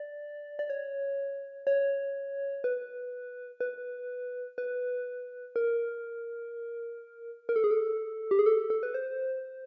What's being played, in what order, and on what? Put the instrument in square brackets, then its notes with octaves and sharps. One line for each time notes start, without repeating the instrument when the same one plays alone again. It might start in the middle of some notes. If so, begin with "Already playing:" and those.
Already playing: [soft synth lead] D5
D5
C#5
C#5
B4
B4
B4
A#4
A#4
A4
G#4
A4
G4
G#4
A4
A4
B4
C5